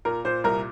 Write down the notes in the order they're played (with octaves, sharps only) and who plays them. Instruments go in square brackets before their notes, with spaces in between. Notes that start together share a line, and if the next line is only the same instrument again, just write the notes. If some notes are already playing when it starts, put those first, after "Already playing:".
[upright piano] A#2 A#4
A#2 C5
C2 A#4